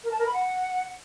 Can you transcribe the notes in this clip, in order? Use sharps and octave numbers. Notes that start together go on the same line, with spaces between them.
A#4
A5
A#4
B5
F#5